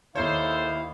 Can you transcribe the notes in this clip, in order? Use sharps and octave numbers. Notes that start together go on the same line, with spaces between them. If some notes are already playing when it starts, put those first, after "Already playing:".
D#2 E4 A4 C5 C#5 F5